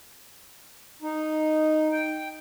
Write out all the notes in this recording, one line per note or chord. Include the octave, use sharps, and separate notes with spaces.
D#4
G5